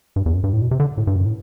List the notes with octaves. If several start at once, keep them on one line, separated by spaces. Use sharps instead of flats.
G2
E2
F#2
G2
A2
B2
C3
D3
A2
G2
F#2
A2